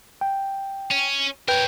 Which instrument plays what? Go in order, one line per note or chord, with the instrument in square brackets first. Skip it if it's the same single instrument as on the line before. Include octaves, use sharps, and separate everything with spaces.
[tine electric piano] G5
[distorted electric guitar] C#4
[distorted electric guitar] A#4 C#5 [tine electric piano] B4 G5 G6